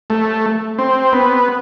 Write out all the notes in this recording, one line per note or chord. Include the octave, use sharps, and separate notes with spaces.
A3
C4
B3